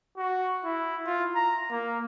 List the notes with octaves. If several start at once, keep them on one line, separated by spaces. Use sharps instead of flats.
F#4
E4
F4
A#5
A#3